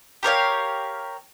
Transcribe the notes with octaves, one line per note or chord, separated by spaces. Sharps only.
G4 A#4 C#5 F5